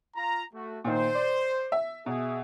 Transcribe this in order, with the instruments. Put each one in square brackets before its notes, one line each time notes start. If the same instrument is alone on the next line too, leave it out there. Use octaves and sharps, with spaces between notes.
[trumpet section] F4 A#5
A3 F#4
[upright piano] A#2 D#3 [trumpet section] C5
[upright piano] D5
E5
[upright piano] B2 [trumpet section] G#4 E5